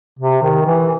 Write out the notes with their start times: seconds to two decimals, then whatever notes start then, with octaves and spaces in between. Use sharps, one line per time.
0.19 C3
0.42 D#3
0.66 E3